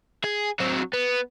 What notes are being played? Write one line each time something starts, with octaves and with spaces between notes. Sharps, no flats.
G#4
F#3 C4
B3